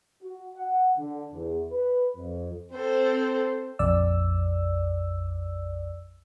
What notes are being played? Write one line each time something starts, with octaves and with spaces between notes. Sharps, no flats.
F#4
F#5
D3
E2
B4
F2
C4 A4 C5
A#1 F2 D5 E6